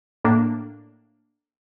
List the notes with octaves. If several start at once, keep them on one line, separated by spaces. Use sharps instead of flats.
A2 A#3 D4